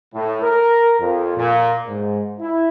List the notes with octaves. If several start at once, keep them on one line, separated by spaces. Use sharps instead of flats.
A2
A#4
F2
A#2
G#2
E4